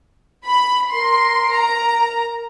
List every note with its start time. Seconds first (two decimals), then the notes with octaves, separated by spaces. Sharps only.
0.46 B5
0.92 A#4 C6
1.56 A#5